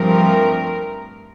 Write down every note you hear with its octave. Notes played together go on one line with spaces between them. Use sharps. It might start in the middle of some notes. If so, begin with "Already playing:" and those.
Already playing: G2 F3 A3 C4 A#4